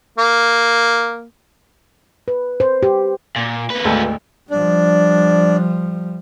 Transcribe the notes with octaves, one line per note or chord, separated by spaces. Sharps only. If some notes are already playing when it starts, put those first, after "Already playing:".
A#3
B4
C5
G4
A#2
A#3 B4
G#1 D2 A4
F3 G3 D4